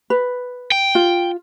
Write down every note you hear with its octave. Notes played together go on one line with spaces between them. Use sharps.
B4
G5
F4